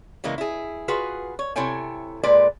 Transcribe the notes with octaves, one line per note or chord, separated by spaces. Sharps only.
C#3 E3 G#3 A#3
E4 G#4
F4 F#4 G#4 B4
C#5
C3 E4 A4 C#5 G5 G#5
A#2 G#3 B4 D5